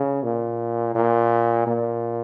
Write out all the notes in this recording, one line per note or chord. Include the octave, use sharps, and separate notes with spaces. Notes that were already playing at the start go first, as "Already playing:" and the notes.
Already playing: C#3
A#2
A#2
A#2